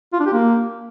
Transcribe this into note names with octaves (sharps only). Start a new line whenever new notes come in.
F4
D4
G4
A#3